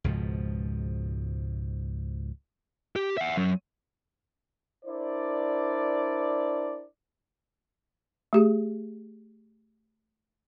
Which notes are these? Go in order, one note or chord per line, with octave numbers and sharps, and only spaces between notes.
C#2 G#2 B2 F3
G4
E5 F#5
F#3 C#4
D4 E4 A#4 C5 D5
A3 G4 G#4